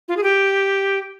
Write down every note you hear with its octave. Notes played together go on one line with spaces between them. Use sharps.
F4
G#4
G4